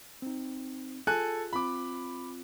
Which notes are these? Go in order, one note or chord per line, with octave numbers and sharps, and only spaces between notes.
C4 D#4
F4 G#4 A4 G#5 F#6
C4 F4 B5 D6